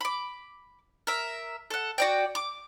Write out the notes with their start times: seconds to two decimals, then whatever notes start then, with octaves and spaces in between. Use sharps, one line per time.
0.01 B5 D6
1.07 A#4 E5
1.70 A4 F#5
1.98 F#4 D5 G5
2.35 D6